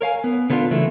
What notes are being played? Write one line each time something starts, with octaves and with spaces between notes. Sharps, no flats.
A#4 C#5 F5 G#5
B3
D3 B3 C#4 D4 F4
C#3 E3 F#3 A3 E4 A#4